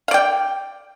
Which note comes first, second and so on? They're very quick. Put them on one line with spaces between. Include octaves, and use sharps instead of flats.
F5 D5 G5